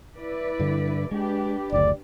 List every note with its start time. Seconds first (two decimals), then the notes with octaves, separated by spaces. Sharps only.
0.16 E4 B4 D5
0.59 G2 D3
1.11 G#3 D4 G4 B4
1.72 F#1 D2 D5